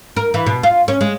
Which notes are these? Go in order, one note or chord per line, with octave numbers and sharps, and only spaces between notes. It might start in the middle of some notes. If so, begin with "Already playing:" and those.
A#4
E3
B2
F4
C#4
G#3